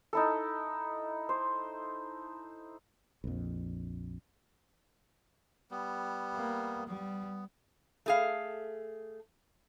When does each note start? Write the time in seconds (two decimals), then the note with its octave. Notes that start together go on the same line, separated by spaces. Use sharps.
0.13 D#4 E4 A4
1.29 C5
3.24 A#1 F2
5.71 G3 B3
6.34 A#3
6.88 G3 B3
8.06 A3 G#4 F5